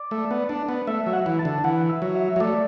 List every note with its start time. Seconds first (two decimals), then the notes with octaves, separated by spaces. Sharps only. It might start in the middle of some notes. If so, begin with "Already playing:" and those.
Already playing: D5
0.11 A3
0.31 B3
0.49 D4
0.69 B3
0.87 A3 E5
1.06 F#3 E5
1.13 F#5
1.26 E3
1.39 A5
1.45 D3
1.64 E3 F#5
1.89 E5
2.02 F#3
2.15 E5
2.36 F#3
2.40 A3 D5